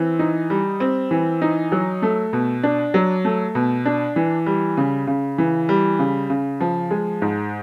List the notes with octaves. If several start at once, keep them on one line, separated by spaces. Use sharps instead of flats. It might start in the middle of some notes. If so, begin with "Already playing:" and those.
Already playing: E3 C4
D#4
G3
C4
E3
D#4
F#3
A3
B2
D4
F#3
A3
B2
D4
E3
G3
C#3
C#3
E3
G3
C#3
C#3
F3
G#3
G#2